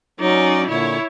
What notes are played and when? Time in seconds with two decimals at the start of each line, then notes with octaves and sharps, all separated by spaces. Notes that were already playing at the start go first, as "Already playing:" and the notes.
0.20 F#3 C#4 D#4 D5
0.67 A#2 D3 E4 C#5